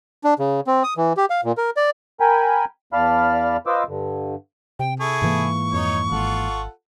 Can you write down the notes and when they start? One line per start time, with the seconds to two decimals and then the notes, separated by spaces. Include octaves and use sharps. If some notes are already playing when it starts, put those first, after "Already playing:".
0.24 D4
0.39 C#3
0.67 C4
0.84 D#6
0.97 E3
1.17 G4
1.30 F5
1.44 A#2
1.57 A#4
1.77 D5
2.20 A#4 G5 G#5 B5
2.93 E2 D5 F5 A5 B5 F6
3.66 F4 B4 C5 D#5 D6 E6
3.88 G2 D3
4.79 C3 G5
5.00 E4 G#4 A4 C#6
5.22 G#2 E3 A#3
5.73 F2 D#4 C#5
6.11 G#1 F4 A4 F#5